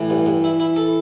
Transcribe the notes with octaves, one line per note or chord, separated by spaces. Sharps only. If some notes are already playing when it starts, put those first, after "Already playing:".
Already playing: A2 E3
G2
G2
E4
E4
A4